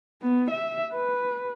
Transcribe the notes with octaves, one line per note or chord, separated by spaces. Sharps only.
B3
E5
B4